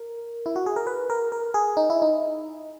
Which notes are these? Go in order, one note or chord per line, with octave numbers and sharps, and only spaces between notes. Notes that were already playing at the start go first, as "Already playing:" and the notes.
Already playing: A#4
E4
F#4
G#4
A#4
B4
A#4
A#4
G#4
D#4
E4
D#4